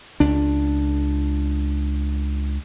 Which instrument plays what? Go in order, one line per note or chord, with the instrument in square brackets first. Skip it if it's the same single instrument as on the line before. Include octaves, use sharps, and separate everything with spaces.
[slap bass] C#2 D4